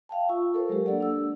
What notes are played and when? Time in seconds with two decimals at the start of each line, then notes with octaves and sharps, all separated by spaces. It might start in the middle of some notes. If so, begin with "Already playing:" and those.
0.09 E5 F5 G5 A5
0.29 F4 C#6 E6
0.54 A4 A#4 C5
0.69 F#3 G#3 G4
0.86 A#3 D4 A4 D5 F#5
1.00 D4 E6